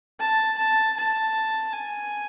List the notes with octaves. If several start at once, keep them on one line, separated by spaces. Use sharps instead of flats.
A5
A5
A5
G#5